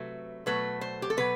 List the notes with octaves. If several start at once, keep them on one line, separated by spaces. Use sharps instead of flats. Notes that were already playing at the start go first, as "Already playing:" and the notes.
Already playing: C3 F#3 A3 B4
B2 F#3 A3 B4
C5
G4
A4
B2 F#3 B4